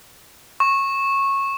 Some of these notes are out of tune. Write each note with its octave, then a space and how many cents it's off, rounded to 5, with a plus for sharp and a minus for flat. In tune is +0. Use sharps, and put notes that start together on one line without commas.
C#6 -15